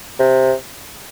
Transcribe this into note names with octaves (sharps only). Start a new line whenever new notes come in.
C3